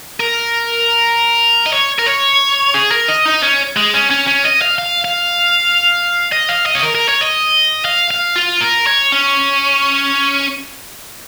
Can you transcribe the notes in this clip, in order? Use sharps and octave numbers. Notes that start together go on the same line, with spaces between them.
A#4
D#5
C#5
A#4
C#5
G#4
A#4
D#5
D#4
C#4
G#3
C#4
C#4
C#4
D#5
F5
F5
F5
D#5
F5
D#5
C#5
A#4
A#4
C#5
D#5
F5
F5
F4
A#4
C#5
C#4